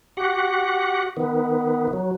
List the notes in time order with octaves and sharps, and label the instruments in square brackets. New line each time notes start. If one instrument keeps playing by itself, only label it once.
[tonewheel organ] F#4 G4 F#5
D#3 B3
F#3